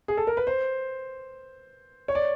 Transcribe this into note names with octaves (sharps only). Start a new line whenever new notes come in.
G#4
A4
A#4
B4
C5
C#5
D5